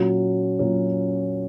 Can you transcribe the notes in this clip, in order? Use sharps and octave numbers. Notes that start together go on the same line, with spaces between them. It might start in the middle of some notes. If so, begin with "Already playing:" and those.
Already playing: A#2 F#3 C#4 F#4
A#2 F#3 C#4 F#4